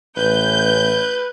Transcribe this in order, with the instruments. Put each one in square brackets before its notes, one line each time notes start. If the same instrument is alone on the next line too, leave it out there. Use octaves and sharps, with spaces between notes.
[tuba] A1 [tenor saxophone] B4 [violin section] G6